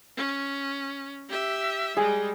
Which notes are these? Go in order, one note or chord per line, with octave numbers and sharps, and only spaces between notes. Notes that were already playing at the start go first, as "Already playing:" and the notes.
C#4
G4 E5
G3 G#3 G#4